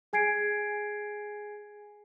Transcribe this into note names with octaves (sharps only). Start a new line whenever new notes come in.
G#4 G#5 G#6 C7 D7